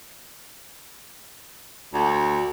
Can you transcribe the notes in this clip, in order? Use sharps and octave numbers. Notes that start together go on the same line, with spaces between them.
D2